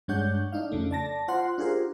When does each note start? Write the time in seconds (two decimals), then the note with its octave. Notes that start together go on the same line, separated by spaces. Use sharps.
0.08 G2 G#3 D4 C#5 F#5 G6
0.52 D4 D#4 F5
0.72 F2 C#3 A3
0.91 D5 A5 A#6
1.28 F4 C5 F#5 C6
1.58 D4 F4 G4 G#4 A#4 C5